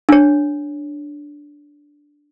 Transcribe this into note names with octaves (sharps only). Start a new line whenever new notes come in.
D4 C#5